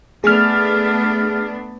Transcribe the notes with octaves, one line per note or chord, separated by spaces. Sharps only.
A3 B3 D4 G#4 F6